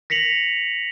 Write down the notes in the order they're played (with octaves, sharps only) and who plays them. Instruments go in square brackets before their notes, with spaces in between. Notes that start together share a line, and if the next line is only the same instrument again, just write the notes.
[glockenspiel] A#6 B6 C#7 F7 F#7